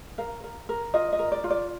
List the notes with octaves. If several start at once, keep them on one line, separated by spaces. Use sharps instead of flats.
A#4 F5
A#4
A#4
F4 D#5
D#5
A#4
D5
F4
D5